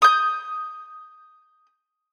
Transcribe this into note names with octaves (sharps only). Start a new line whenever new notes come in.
D#6 G6